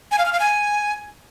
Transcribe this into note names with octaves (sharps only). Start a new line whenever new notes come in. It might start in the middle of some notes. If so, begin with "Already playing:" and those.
G#5
F5
F6
F5
G#5